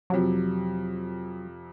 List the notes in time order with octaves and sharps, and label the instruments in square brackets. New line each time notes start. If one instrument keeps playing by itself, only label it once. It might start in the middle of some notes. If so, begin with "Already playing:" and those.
[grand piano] F2 C3 [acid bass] F#3